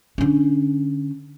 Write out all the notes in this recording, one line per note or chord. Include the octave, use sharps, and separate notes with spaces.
D3 C#4